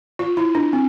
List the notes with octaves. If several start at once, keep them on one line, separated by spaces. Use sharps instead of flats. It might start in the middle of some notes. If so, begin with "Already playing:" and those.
F4
E4
D4
C4